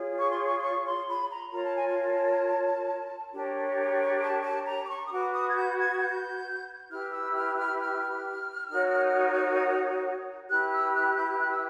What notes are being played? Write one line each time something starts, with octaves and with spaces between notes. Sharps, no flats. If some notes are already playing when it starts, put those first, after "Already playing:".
Already playing: F4 G#4 C#5
C#6
C6
C#6
C6
C#6
C6
B5
A#5
F4 A#4 C#5 A#5
A5
G#5
A5
D4 G4 A#4 C#5
A5
A5
A#5
D6
C#6
D#6
F#4 B4 D6
D#6
G#6
G6
G#6
G6
E4 G4 B4 F6
E6
F6
F6
F6
D#4 F#4 A#4 C#5
E4 G4 B4 F#6
E6
F#6
G6
F#6
E6